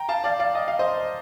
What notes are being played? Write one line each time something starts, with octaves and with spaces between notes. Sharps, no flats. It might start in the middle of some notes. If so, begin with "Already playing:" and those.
Already playing: G5 A#5
F5 A5
D5 F5
D5 F5
D#5
F5
C5 D#5